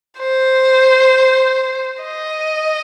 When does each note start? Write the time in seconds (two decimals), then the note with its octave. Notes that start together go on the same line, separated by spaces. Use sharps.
0.19 C5
2.03 D#5